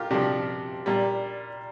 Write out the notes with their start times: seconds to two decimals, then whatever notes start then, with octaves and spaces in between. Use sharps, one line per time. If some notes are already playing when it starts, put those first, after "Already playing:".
Already playing: F4 G4 A#4
0.11 C3 F3 D4 G4
0.86 A#2 G3